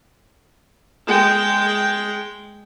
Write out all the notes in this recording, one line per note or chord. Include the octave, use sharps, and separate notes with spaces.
G#3 G5